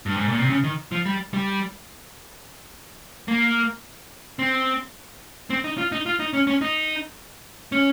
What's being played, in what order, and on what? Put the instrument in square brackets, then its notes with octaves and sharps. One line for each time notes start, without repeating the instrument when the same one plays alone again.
[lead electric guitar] G2
G#2
A#2
C3
C#3
D#3
F3
G3
G3
A#3
C4
C4
D#4
F4
D#4
F4
D#4
C#4
C#4
D#4
C#4